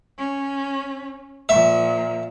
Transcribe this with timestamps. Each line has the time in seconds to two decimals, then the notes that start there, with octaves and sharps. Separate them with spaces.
0.18 C#4
1.49 A#2 F3 E5